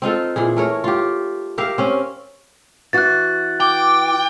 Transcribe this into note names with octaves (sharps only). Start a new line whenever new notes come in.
C4 D#4 F4 A4
A#2 E3 G#4
A3 A#4 C#5
F4 G4
G4 A#4 E5 F5
C4 C#4
E3 F#4 F#6 A6
G5 D6